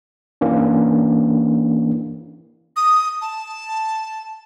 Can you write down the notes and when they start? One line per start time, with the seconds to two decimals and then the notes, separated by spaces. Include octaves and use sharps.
0.41 E3 A#3 C#4 D4
2.76 D#6
3.21 A5